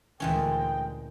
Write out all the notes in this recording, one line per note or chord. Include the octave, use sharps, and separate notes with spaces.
D2 A#2 E3 G#3 C#4 G5